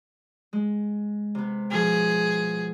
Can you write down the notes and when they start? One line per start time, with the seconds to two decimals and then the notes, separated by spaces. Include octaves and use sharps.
0.53 G#3
1.35 C3 B3
1.71 B2 F3 G#4